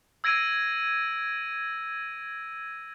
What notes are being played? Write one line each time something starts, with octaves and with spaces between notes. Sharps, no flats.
E6 G#6 A#6 D7 D#7